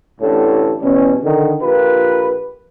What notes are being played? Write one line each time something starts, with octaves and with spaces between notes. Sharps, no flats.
A1 D2 A2 D3 G4 A4
B2 E3 G3 C#4
D3 D#3
A#1 F4 G4 A#4 B4